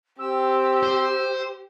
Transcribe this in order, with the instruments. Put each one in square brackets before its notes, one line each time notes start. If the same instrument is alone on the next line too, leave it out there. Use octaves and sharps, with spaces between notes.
[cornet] C4 [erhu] G4 [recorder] E6
[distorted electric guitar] C5